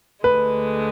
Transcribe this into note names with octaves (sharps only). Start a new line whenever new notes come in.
D2 D3 G#3 B4